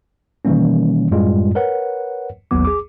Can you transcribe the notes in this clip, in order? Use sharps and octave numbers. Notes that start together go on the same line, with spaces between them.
B2 D#3 E3 G3 A#3 C#4
F#2 A2 G3 G#3 F4
A#4 B4 C#5 F#5
A1 D#2 F#3 B3 D6
G#4 D6